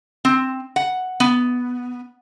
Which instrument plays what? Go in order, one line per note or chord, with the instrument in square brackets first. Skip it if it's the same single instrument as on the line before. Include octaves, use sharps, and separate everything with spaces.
[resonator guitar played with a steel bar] C4
F#5
B3